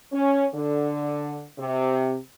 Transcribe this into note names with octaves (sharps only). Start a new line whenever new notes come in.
C#4
D3
C3